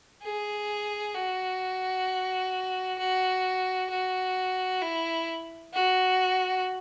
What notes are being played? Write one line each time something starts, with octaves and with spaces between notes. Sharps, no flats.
G#4
F#4
F#4
F#4
E4
F#4